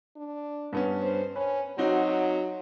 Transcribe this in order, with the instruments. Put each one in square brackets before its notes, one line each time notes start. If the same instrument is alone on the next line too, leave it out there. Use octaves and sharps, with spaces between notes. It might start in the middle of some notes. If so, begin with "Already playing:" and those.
[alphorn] D4
[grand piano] G2 B3 C#4
[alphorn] C5
[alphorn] C#4 [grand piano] B4
[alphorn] F#3 [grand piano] C4 D#4 F#4